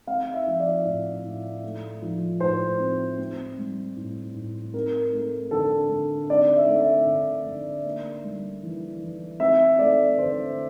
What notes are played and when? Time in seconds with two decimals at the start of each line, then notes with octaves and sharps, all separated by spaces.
0.07 C4 F5
0.34 E5
0.47 F3
0.60 D5
0.85 A2
1.24 A2
1.64 A3
2.02 F3
2.40 A2 C5
2.80 C4
3.18 C4
3.58 G3
3.96 A2
4.35 A2
4.74 C4 A#4
5.13 A3
5.51 D3 A4
5.90 D3
6.30 C4 D5
6.56 E5
6.68 A3
6.81 E5
7.07 D3
7.46 D3
7.85 A#3
8.24 G3
8.63 E3
9.01 E3
9.40 C4 E5
9.79 A3 D5
10.18 D3 C5